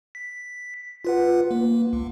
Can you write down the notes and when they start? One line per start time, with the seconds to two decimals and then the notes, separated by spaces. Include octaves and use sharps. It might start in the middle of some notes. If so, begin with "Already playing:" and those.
0.15 B6
1.05 F4 B4 F#5
1.51 A#3
1.93 C#2